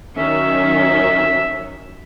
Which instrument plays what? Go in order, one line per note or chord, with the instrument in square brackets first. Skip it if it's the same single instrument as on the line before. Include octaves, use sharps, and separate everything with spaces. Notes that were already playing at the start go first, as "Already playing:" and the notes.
[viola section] D#3 F#3 C#4 [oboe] E5